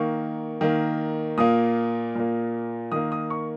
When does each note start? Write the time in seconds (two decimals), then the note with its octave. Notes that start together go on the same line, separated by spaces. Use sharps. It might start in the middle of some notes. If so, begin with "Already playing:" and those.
Already playing: D#3 A#3 C#6
0.61 D#3 A#3
1.38 A#2 A#3 D#6
2.15 A#2 A#3
2.92 D#3 A#3 D#6
3.12 D#6
3.30 C#6